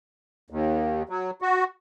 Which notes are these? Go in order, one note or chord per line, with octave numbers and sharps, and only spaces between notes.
D#2
F#3
F#4